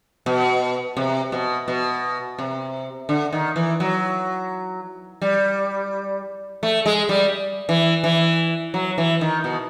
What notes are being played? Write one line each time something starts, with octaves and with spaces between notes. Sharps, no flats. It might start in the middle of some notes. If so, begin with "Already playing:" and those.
B2
C3
B2
B2
C3
D3
D#3
E3
F#3
G3
A3
G#3
G3
E3
E3
F#3
E3
D#3
B2